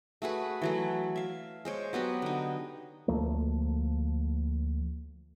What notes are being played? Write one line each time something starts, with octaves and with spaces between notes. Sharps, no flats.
A3 F#4 G#4 B4
E3 F#3 A3
E5 F5
G#3 C5 C#5
F#3 B3 F#4 G4
D3 D#4
D2 F3 A3 A#3